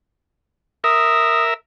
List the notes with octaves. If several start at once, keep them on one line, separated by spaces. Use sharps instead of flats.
A#4 E5 D#6